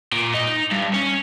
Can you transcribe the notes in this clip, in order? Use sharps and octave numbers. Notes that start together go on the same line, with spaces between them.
A#2
D#4
G2
C#4